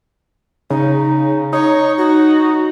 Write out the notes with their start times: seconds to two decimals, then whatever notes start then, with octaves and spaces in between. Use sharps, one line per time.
0.70 C#3 D#4
1.53 D#4 C#5
1.98 F#4